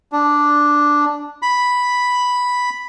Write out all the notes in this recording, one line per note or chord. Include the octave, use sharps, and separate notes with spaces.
D4
B5